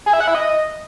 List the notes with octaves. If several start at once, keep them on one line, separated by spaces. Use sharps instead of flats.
G#4
E4
F#5
E4
D#5